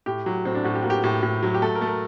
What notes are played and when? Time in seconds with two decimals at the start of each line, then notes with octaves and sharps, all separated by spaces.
0.06 A2 G4
0.26 F#3
0.45 A2 C4
0.55 D4
0.64 A2 F#4
0.75 G4
0.82 A#3 F#4
0.90 G4
1.04 A2
1.23 A2
1.43 F#3
1.54 G4
1.62 A3 A4
1.75 A#4
1.81 A3
1.88 A#4